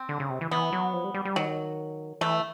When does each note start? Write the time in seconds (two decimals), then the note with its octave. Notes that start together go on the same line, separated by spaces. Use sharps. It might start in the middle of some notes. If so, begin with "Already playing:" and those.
Already playing: C4
0.09 D3
0.20 C#3
0.30 C3
0.41 E3
0.51 E3 B3
0.72 F#3
0.93 F3
1.04 G3
1.14 G3
1.25 G3
1.36 D#3 F#3
2.21 E3 A3